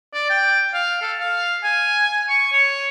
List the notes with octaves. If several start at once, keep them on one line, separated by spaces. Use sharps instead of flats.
D5
G5
F5
A4
F5
G#5
C#6
C#5